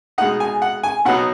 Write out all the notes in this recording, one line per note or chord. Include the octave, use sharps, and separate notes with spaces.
B2 G#3 D#4 F#5
G#5
F#5
G#5
B2 F#3 B3 D#4 F#5